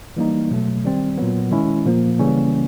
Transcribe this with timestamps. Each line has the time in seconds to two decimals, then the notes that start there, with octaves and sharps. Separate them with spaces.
0.16 E3 G3 A#3 D#4
0.51 B2 F#3 A3
0.85 D#3 G3 C4
1.18 A#2 F#3 B3
1.51 D#3 G#3 C#4 E4
1.85 A#2 F3 A#3
2.19 C#3 E3 G3 A#3 C#4